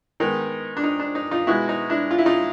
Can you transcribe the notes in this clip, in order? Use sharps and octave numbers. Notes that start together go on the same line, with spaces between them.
D#3 G#3 B3 D#4
D4
D#4
D4
D#4
D#4 F4
B2 G#3 B3 E4 F#4
D#4
D4 E4
F4
E4
D#4 F4